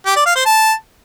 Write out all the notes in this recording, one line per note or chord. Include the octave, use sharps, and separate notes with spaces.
G4
D5
F5
C5
A5